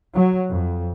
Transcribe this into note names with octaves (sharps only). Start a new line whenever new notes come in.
F#3
F2